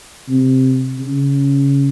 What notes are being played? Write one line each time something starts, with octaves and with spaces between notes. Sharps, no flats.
C3
C#3